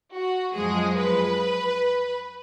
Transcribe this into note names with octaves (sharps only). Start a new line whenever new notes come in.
F#4
F#2 F3 G#3 G#4
B4